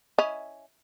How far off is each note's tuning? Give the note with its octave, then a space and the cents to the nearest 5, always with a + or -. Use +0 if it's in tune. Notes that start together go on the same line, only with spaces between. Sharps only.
C#4 +5 E4 +0 D#5 +0